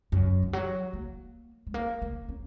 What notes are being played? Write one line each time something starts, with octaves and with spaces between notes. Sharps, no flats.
F#2
D#3
F#3
A#3
G#3
A#3
A#3
C#4